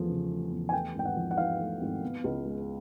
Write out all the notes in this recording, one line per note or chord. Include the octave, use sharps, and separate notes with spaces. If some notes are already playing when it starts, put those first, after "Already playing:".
Already playing: E2 F3 A3
C#3
A3
E2
G#5
A3 G5
G#1 G5
F#5
F3
F#5
G#2 F5
A3
G#1
B3
C#2
G#3